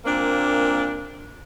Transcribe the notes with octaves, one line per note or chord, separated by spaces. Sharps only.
A#2 A#3 C4 D4